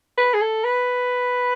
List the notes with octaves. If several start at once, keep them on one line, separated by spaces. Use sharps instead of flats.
B4
G#4
A4
B4